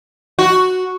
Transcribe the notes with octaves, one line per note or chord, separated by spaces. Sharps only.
F#4